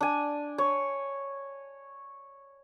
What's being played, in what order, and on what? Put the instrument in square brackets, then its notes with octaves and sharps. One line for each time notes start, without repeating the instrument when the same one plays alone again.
[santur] D4 G#5
C#5